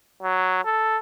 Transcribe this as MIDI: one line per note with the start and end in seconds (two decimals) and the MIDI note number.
0.23 0.62 54
0.65 0.97 69